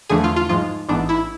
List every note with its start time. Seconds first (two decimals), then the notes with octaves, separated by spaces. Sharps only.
0.09 E2 D3 F3 A3 D4 G#4
0.24 F4
0.36 F4
0.49 G#2 F3 G#3 F4
0.88 A1 G#2 E3 B3 D4
1.09 E4